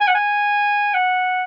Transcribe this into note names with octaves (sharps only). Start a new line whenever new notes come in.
G#5
F#5
G#5
F#5